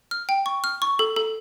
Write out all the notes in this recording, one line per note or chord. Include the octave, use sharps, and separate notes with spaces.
F6
G5
C#6
F6
C#6
A4
A4